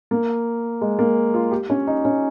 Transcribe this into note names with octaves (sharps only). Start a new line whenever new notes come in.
A#3
G#3
A#3
F4
G4
C#4
D#4
C#4